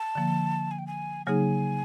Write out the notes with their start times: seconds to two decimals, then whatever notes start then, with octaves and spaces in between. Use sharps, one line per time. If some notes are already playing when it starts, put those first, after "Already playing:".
Already playing: A5
0.15 D3 F3 A#3
0.71 G#5
0.79 G5
0.87 G#5
1.26 C#3 F#3 A#3 D#4 G#4 G#5